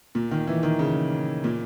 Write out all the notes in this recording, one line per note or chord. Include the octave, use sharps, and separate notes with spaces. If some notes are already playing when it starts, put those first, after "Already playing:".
A#2
D#3
E3
D#3
C#3
A#2